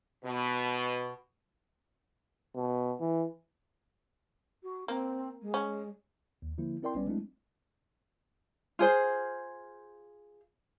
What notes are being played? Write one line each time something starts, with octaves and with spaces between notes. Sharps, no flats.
B2
B2
E3
F#4
A#3 C4
G#3
C#4
D#2
D3 F3 A#3 E4
C4 E4 A#4 D5 G5 C6
A#1 G3 B3 C#4 B4 D5
F#3 G#3 A3 C4 D4 E4
F4 G#4 C5